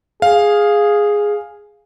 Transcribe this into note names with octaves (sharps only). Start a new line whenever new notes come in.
G#4 F5